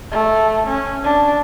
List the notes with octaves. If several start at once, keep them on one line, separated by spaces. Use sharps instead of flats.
A3
C#4
D4